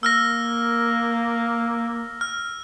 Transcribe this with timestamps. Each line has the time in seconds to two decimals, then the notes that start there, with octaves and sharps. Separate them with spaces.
0.03 A#3 E6 F6 A#6
2.21 F6